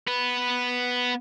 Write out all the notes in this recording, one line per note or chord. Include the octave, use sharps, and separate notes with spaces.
B3 B4